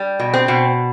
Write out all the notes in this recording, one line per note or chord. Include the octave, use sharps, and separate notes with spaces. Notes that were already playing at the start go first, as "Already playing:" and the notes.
Already playing: G3
B2
C4
B2